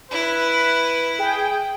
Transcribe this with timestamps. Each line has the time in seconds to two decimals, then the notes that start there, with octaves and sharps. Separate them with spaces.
0.11 E4 B4
1.19 G#4 G5